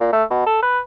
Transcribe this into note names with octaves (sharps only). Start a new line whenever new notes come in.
A#2
A3
B2
A4
B4